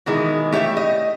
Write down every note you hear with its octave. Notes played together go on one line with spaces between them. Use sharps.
B2 D#3 E3 G#3
A3 G4 C#5 D5 E5
D#5